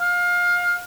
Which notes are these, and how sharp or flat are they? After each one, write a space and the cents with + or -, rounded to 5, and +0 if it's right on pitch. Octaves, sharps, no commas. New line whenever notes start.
F5 +25